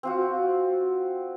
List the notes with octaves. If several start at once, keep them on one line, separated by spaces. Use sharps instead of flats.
C4 F4 F#4